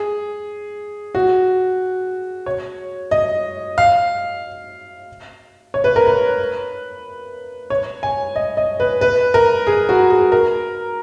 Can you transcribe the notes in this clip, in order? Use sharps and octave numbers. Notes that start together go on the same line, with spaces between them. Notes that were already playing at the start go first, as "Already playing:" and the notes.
Already playing: G#4
F#4
C#5
D#5
F5
C#5
B4
A#4
B4
C#5
G#5
D#5
D#5
B4
B4
A#4
G#4
F#4
G#4
A#4